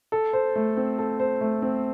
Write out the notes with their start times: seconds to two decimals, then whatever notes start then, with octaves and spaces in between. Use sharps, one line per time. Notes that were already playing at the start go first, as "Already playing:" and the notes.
0.12 A4
0.33 C5
0.56 A3
0.77 C4
0.99 A4
1.20 C5
1.41 A3
1.62 C4